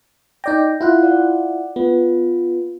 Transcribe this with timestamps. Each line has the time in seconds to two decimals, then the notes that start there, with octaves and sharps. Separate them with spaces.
0.44 D#4 D5 G5 G6 A#6
0.81 E4 F4 F5 F#5 F#6
1.03 D5 F#5
1.76 B3 F4